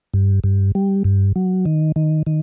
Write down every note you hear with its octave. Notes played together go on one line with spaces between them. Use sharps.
G2
G2
G3
G2
F#3
D#3
D#3
D#3